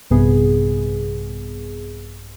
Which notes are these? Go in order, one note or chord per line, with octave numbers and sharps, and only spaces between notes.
A#1 G2 C3 B3 G#4